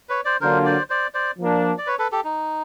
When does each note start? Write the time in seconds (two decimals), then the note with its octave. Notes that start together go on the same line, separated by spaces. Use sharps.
0.09 B4 C#5
0.25 C5 D5
0.41 D3 F#3 A#3 D4 F4 A#4 C5
0.65 C5 D5
0.90 C5 D5
1.14 C5 D5
1.39 F3 A#3 D4
1.78 D5
1.87 B4 C#5
1.99 A4 B4
2.12 G4 A4
2.24 D#4